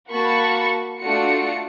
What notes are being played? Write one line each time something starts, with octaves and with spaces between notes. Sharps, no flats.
A#3 F#4 A5 B5 C#6 C#7
A3 D4 F4 F#4 C#7